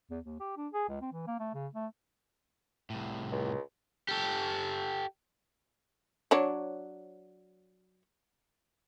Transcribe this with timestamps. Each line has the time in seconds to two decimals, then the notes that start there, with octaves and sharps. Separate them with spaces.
0.10 E2
0.24 D#2
0.40 G4
0.57 D4
0.73 G#4
0.89 C#2
1.01 C4
1.13 E3
1.27 A#3
1.40 A3
1.54 C#3
1.75 A3
2.90 C2 A2
3.32 C#2
4.09 G4 A4
6.31 F#3 D4 C#5